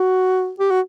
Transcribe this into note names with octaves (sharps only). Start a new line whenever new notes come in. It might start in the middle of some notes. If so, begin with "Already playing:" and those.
Already playing: F#4
G4
F#4